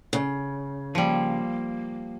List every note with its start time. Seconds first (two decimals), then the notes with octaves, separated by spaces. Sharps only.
0.13 C#3
0.95 F3 G3 A#3